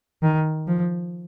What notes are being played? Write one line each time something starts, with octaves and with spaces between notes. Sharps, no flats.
D#3
F3